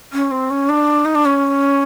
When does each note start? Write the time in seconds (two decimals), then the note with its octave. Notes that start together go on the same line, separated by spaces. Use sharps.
0.12 C#4
0.31 C4
0.50 C#4
0.69 D4
1.04 D#4
1.15 D4
1.25 C#4